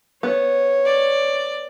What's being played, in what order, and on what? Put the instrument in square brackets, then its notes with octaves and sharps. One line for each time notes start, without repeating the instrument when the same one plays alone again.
[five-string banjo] B3 [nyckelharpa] C#5
[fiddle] D5